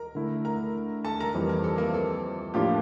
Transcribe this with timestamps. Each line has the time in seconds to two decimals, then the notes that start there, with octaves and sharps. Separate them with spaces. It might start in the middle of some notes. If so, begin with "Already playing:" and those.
Already playing: A#4 A#5
0.15 D3 A3 E4
0.45 A#4 A#5
1.05 A4 A5
1.20 A#4 A#5
1.34 F2 E3 G3
1.49 A#4
1.64 A4
1.78 A#3 A#4
1.94 A4
2.54 A2 F3 A#3 D4 F4 G4